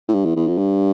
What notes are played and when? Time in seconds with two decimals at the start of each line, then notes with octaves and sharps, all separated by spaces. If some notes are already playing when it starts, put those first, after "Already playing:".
0.09 A2
0.14 G2
0.25 E2
0.36 E2
0.48 F2
0.58 G2